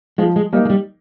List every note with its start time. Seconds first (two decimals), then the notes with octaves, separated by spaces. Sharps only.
0.18 F3 G#3
0.36 G#3
0.53 G3 A#3 D#4
0.65 G#3
0.70 G3